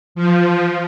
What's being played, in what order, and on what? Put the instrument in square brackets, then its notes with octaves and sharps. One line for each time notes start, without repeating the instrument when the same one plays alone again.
[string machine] F3